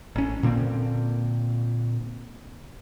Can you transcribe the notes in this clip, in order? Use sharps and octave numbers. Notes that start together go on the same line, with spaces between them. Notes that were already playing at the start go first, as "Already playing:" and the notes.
A1 C#4
A#2 D3 A#3 C4